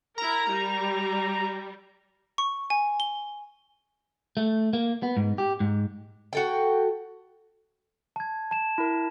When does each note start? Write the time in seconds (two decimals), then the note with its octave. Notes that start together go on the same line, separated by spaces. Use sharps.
0.18 E4 A#4 A#5
0.51 G3
2.38 C#6
2.70 G#5
3.00 G7
4.37 A3
4.73 A#3
5.03 B3
5.17 G#2
5.38 G4
5.60 G#2
6.33 F#4 A4 G5
8.16 A5 G#6
8.51 A5 E7
8.78 E4 A#4